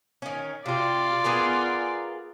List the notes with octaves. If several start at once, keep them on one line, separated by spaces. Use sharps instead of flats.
D#3 C#4
C3 F4 G4 D5
B3 G#4 A#4